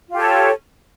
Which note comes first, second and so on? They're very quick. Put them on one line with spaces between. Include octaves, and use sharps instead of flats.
F4 G4 A4 C#5